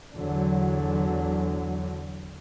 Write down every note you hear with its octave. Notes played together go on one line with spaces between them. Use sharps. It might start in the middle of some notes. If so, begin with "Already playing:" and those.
E2 D3 F#3